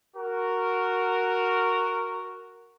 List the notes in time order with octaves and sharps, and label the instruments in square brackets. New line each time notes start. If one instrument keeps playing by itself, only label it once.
[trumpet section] F#4 A#4